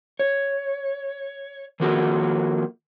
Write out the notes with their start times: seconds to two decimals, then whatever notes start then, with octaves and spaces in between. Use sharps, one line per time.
0.19 C#5
1.80 D#3 F3 A#3 F#4 G#4 A4